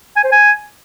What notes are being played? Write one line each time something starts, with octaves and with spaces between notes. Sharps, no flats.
G#5
C5
G#5